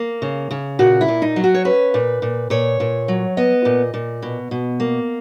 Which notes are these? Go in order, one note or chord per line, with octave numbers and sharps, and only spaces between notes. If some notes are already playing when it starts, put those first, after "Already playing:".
Already playing: A#3
C#3
C#3
A#2 F#4
E4
A#2
D#4
F#3
F#4
C#5
C#4 B4
A#2
A#2
A#2 C#5
A#2
F#3
B3 D#5
A#2
A#2
B2
B2
A#3